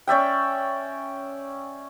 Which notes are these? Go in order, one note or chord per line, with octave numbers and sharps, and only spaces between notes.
C#4 D5 E5 G5